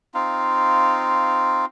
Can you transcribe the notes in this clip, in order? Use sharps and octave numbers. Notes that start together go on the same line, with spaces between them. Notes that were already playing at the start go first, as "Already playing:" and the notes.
C4 D#4 F4 F5